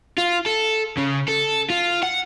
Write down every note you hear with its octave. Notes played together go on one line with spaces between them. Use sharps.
F4
A4
C#3
A4
F4
F#5